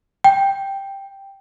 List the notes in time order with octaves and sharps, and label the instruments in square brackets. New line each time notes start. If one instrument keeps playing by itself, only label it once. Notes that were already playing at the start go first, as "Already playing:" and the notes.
[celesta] G5